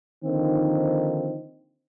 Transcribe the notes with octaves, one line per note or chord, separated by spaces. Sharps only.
D3 D#3 F3 A#3 C4 D#4